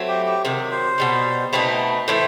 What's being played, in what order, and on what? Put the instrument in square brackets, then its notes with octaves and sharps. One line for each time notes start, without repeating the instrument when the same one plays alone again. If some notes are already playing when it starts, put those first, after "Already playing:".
Already playing: [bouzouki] F#3 A3 C4 E4
[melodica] G4
G4
[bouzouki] C3 D#3 F#3
[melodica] C5
[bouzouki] B2 G3 D#4
[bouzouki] B2 A3 C4 D#4 [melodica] B4
[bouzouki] A2 E3 A3 [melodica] C5